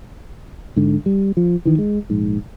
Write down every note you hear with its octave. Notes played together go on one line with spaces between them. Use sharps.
G#2 D3
G3
F3
D#3 E3
G#3
A#1 G#2